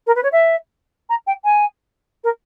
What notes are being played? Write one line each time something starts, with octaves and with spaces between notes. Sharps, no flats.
A#4
B4
C#5
E5
A#5
G5
G#5
A#4